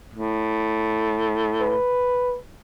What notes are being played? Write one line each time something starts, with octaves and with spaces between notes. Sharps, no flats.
A2
B4